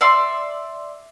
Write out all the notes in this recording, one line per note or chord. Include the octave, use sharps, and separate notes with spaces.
D5 E5 C6